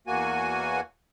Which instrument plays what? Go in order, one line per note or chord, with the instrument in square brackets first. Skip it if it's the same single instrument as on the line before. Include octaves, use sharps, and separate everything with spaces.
[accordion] E2 A#3 F#4 G#5